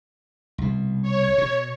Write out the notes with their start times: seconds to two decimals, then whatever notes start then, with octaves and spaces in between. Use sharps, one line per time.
0.58 C2 B2
1.02 C#5
1.38 B2